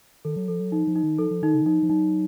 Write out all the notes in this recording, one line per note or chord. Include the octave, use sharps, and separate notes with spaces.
D#3 A4
F#3
F3 A4
F#3
F3 D#4
F3
D#4
D#3
F3 A4
F3
D#3 D#4
C#3
D#3
F3 D#4
F3
F#3 D#4